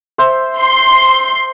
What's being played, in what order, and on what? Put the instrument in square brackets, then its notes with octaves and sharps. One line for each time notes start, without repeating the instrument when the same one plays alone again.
[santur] C5 E5
[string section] C6